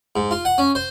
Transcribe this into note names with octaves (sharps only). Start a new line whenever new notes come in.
G#2
F4
F#5
C#4
C5